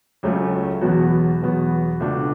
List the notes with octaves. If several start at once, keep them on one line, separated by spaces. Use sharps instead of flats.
C#2 C#3 F#3 A3 C#4
E2 B2 F#3 B3 F#4
E2 B2 F#3 B3 F#4
C#2 B2 A3 D4 F#4